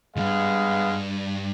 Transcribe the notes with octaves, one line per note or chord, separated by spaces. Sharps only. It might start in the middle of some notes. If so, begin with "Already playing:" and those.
C#2 G2 G#3 B3 F5